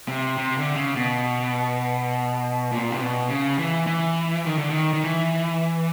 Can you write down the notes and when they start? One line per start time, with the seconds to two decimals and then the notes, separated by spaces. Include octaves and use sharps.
0.08 C3
0.38 C3
0.58 D3
0.76 C#3
0.96 B2
2.71 A#2
2.90 C3
2.99 B2
3.29 C#3
3.59 E3
3.87 E3
4.46 D#3
4.58 D3
4.70 D#3
4.93 D#3
5.04 E3